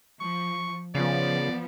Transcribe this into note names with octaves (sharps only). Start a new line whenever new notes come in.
F3 C#6
C#3 F3 B3 D5